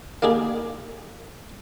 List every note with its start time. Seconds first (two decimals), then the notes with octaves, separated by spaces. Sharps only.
0.22 A#3 D#4 G4 G#4